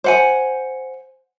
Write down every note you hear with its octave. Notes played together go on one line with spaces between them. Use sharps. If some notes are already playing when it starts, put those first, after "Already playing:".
C5 F#5 G#5